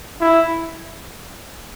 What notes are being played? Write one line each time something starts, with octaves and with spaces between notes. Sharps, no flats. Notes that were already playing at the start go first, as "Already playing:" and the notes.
E4